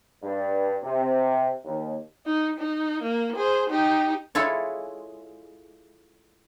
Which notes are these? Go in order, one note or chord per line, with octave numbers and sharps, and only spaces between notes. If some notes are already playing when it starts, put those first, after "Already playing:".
G2
C3
D#2
D#4
D#4
A#3
G#4 C5
D#4 G4
G#3 E4 F4 A4 C#5